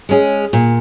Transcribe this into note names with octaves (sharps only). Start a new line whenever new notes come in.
G#3 C#4 G#4
A#2